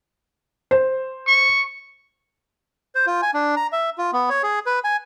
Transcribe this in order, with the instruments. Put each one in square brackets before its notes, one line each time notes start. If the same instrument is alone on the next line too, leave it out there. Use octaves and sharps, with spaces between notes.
[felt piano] C5
[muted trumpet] C#6
[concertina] C5
F4
G#5
D4
A#5
E5
F4
B3
C#5
G#4
B4
G#5